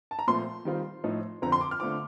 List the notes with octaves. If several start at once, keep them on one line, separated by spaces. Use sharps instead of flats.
A5
A#5
A#2 F3 A3 C4 C6
D#3 G3 C4 F4
A2 F3 A3 D#4
F2 D3 F3 C4 A#5
C6
D6
F6
D3 A3 C4 F4 D6